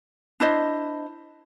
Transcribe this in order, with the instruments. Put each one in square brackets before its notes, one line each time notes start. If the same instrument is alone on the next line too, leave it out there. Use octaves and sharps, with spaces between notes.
[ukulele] D4 E4 C5 D#5